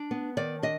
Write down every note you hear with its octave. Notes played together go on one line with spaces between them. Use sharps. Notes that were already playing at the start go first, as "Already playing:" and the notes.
Already playing: D4
B3
D#3 D5
D4 D#5